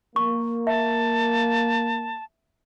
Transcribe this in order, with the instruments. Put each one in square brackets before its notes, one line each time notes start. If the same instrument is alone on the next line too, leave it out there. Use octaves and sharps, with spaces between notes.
[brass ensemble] A#3 [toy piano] C#6
[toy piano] E5 [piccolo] A5